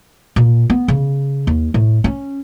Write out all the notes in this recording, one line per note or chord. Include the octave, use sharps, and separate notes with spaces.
A#2
B3
C#3
D#2
A2
C#4